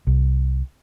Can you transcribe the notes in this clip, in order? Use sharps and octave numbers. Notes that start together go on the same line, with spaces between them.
C2